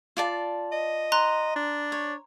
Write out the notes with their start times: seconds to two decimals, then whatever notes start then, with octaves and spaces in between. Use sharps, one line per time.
0.17 F4 D5 A5
0.72 D#5
1.12 A#5 C6 F#6
1.55 D4
1.92 C#5